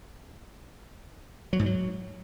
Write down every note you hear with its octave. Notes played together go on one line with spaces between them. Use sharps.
F#3
G#2
F#3